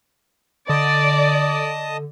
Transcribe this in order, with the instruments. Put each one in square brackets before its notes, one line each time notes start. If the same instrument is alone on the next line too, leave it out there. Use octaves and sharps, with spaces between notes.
[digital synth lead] D3 [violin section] D5 [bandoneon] D#5 A5 D#6